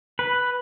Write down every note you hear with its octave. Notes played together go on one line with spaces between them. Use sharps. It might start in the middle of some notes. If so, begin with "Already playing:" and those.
B4